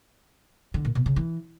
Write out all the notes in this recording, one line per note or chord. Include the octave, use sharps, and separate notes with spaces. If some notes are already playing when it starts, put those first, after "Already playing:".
D3
A#2
B2
C#3
E3